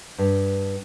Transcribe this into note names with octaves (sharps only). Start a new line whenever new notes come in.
G2